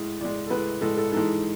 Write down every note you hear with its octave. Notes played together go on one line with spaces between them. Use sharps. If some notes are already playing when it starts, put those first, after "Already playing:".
Already playing: A2 G#3
A2 G#3 D5
A4
A2 G#3 B4
A2 G#3 A4
A4
G#2 E3 G#3 A4